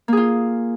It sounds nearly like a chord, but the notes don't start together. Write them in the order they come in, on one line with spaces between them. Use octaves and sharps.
A#3 G#4 F4